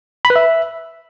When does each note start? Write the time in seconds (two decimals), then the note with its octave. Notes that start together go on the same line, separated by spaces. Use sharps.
0.25 B5
0.30 B4
0.36 E5